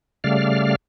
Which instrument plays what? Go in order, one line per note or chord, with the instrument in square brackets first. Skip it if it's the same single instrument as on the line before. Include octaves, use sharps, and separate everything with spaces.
[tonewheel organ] C#3 G3 A3 D5 F5 F6